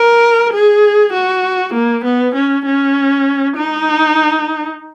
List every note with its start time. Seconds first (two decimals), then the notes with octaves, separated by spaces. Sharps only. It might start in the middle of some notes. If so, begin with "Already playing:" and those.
Already playing: A#4
0.54 G#4
1.14 F#4
1.74 A#3
2.05 B3
2.36 C#4
2.66 C#4
3.57 D#4